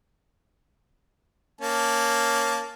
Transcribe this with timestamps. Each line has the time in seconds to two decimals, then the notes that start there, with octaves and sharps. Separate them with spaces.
1.61 A#3 C#4 A5